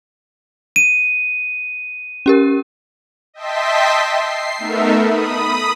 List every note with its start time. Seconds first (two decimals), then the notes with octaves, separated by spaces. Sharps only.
0.76 D#7
2.26 C#4 G4 A#4
3.34 D#5 E5 G5 A5 C6 B6
4.12 C7
4.59 A3 B3 D#4 A4 A#4 E5
5.05 B5 D#6